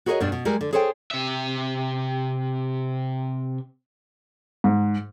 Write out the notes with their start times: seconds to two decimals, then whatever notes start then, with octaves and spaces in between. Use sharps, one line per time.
0.06 F#4 G#4 A#4 C5 C#5 D#5
0.20 G2 B2 G3 D4
0.32 B2
0.45 G3 G#3 A#4
0.61 D3
0.73 G#4 A4 C5 C#5 G5
1.11 C3 E5
4.64 G#2